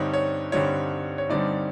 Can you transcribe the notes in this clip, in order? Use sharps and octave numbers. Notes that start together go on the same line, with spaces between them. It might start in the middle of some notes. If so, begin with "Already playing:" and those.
Already playing: G2 D3 G3 C4 D#4 C#5
C#5
G2 D3 G3 C4 D#4 C#5
C#5
G2 D3 G3 C4 D#4 D5